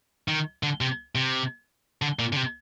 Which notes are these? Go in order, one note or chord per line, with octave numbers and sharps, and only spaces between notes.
D#3
D3
C3
C3
D3
A#2
D3
C3